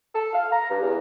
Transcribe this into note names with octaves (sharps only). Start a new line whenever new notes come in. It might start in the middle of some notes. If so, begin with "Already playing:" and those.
A4
F5
A#5
G2
E2